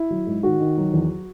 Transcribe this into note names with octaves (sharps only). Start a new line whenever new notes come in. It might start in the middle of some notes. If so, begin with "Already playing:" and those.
Already playing: E4
F#3
G#2
D#3 F#4
D#3
F#3
E2